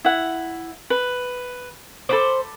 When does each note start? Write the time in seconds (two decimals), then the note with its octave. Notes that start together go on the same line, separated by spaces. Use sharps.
0.05 E4 F#5
0.90 B4
2.09 A4 C5 B5 D6